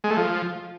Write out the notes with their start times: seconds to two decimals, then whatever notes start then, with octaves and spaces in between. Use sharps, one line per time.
0.04 G#3
0.11 A3
0.17 F3